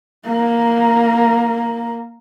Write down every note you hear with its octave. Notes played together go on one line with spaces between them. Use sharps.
A#3 A#4